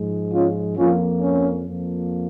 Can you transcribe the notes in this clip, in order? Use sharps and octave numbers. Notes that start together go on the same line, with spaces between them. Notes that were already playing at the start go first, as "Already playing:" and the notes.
Already playing: G#2 F3 G#3
C#4 F4
F2 F3 A#3 C#4 F4
C#4
F2 F3 A#3